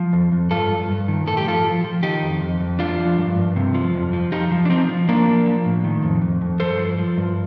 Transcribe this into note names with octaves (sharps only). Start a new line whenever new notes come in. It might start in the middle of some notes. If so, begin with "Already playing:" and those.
Already playing: F3
F2
F2
G2 F4 A4
G2
G2
D#3
A2 A4
G4
F3 F4 A4
F3
F3
D#3 D#4 G4
F2
F2
F2
F3 D4 F4
F3
G2
G2
C3
F3
F2
F3
F3 D#4 G4
F3
D4
F3 C4 D#4
F3
F3 A#3 D4
F3
F3
A2
D#3
F2
F2
F2
G2 A4 C5
F3
F3
G2